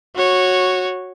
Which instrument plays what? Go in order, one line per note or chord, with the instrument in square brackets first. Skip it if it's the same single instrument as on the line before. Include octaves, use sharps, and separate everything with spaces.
[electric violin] F#4 C#5